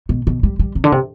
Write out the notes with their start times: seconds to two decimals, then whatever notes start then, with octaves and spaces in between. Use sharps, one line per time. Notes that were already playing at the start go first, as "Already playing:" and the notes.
0.09 B2
0.27 B2
0.43 G3
0.59 G3
0.75 C3
0.84 D3
0.92 C3